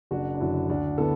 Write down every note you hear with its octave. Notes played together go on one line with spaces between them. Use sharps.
F#1 D4 F#4
D4
F#2 D3 F#3 E4
D2 D4 F#4
D3 B3 E4 A4